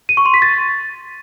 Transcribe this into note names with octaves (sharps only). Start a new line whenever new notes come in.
D#7
C#6
C6
B6
A6